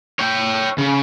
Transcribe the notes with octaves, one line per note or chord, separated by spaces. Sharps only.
C#5 G5
C#3